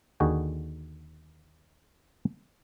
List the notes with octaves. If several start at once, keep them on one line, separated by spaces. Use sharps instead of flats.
D#2 D3 F#4 G#4 D#5 G5